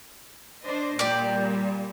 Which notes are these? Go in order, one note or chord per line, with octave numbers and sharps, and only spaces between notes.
D4 C5 D#5
A#2 G3 G4 D5